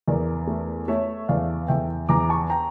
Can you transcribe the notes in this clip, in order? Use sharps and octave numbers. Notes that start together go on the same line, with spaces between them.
E2 A#4 D5
A3
A3 C#5 E5
E2 D5 F5
E2 E5 G5
E2 A#5 D6
A5 C#6
G5 A#5